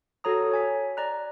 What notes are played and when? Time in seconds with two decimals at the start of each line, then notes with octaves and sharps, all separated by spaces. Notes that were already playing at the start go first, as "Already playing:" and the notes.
0.24 F#4 A4 C#5 A#5 D#6
0.51 C#5 G#5 B6
0.97 D5 A#5 F#6